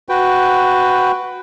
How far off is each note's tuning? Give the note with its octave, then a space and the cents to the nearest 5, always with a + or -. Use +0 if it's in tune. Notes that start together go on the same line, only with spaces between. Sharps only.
F#4 +0 B4 +10 G5 +0